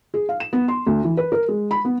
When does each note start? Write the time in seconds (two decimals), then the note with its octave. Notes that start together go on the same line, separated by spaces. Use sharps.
0.14 G#4
0.29 F5
0.40 E7
0.53 B3
0.68 C6
0.86 D2
1.04 E3
1.17 B4
1.32 A#4
1.48 G#3
1.71 B5
1.85 B3